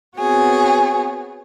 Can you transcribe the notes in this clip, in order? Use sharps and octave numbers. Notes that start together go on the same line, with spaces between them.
B3 C4 F#4 G#4 C#5